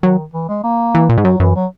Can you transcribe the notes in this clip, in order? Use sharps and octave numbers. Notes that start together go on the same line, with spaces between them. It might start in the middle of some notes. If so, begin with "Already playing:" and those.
D#3 F#3
E3
G#3
A#3
E3
A#2
G#2
F#2 F#3
F#2 E3
F#3